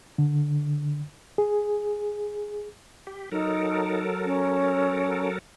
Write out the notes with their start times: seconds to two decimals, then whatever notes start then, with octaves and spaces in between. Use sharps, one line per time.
0.18 D3
1.38 G#4
3.07 G4
3.32 F#3 D#4 A4 A#4
4.25 C#4